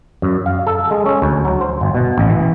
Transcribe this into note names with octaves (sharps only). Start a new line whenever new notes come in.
F#2
F5
A4
G#3
C#4
D2
F#3
C5
G1
B2
A1
E3